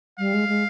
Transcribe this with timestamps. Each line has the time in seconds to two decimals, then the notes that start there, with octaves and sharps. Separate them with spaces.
0.19 G3 F5
0.34 G#3
0.48 G#3